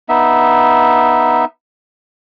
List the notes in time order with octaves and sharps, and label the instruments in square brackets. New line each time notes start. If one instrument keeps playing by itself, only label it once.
[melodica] B3 D#4 E5